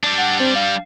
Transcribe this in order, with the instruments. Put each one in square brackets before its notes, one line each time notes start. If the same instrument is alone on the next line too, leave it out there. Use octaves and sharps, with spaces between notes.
[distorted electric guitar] G3 D4
[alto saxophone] F#5
C4
F5